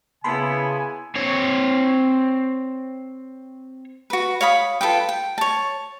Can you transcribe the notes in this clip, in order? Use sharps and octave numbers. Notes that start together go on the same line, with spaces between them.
C#3 B3 E4 G#5 A5 B5 C6
C4 C#5
F#4 B4
C#5 F5 B5 D#6
F4 A4 B4 G5
G5
C#5 A5